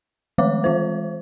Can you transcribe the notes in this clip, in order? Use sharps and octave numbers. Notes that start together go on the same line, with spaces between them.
D#3 F3 G#3 A3 C#5 D6
E3 G#3 F4 C5